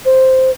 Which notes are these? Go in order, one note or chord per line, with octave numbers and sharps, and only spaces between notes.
C5